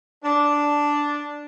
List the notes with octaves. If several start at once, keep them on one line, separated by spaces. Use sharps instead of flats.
D4